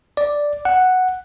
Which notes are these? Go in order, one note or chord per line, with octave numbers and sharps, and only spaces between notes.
D5
F#5